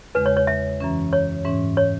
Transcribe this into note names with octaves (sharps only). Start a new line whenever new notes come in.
E2 C#3 G#3 B4
C#5
C#5
E5
F#2 E3 C#4
C#5
G#2 E3 C#4
C#5